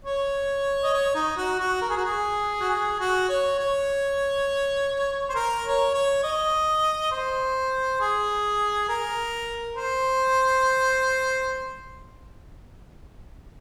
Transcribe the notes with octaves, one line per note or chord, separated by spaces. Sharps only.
C#5
D#5
C#5
D#4
F#4
F#4
A#4
G#4
F#4
G#4
F#4
G#4
F#4
C#5
C#5
C5
A#4
C#5
C#5
D#5
C5
G#4
A#4
C5